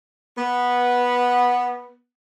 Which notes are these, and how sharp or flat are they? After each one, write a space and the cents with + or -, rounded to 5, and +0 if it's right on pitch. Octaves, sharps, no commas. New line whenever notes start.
B3 -10